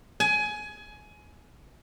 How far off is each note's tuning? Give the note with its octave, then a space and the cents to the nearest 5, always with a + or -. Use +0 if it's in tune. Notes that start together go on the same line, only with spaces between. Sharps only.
G#5 +20